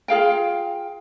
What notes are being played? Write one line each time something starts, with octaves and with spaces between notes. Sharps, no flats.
F4 G#4 F5 G5